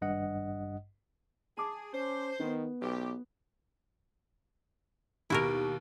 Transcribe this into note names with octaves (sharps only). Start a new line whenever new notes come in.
G#1 G2 D#5 F#5
G#4 A5 D6
C#4 C5
D#3 B3
B1 G4
D#2 B2 E4 F#4 G4 A#4 D7